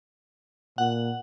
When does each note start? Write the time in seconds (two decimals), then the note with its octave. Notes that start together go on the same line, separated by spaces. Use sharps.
0.78 A#2 F#5